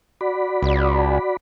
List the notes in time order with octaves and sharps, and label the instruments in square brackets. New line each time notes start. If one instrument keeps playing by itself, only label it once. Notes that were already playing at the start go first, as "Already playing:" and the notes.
[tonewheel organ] F#4 D5 B5
[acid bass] C#2